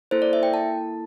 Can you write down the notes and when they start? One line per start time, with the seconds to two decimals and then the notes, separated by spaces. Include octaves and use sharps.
0.11 A#3 E4 A4 C5
0.22 D5
0.33 E5
0.43 G5
0.54 A5